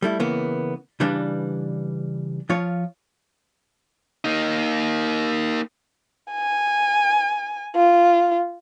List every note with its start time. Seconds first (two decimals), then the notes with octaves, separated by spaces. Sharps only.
0.02 G3 A3 E4
0.20 C#3 E3 A#3 B3
1.00 C#3 E3 G3 D4 B4
2.49 F3 F4 C#5
4.25 A#3 D#4
6.32 G#5
7.76 F4